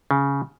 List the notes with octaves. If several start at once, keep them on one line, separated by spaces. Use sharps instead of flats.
C#3